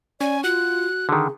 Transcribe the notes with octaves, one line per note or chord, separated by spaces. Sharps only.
C#4 D5 G#5
F4 F#4 F#6
D3 D#3 G#4